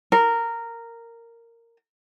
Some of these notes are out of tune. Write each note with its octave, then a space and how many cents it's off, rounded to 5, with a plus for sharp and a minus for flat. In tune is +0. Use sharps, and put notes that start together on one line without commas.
A#4 -10